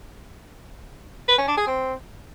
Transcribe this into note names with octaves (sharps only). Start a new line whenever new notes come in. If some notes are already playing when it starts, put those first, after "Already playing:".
B4
C#4
D4
G#4
C4